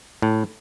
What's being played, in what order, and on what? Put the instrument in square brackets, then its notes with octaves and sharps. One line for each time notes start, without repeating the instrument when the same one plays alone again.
[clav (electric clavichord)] A2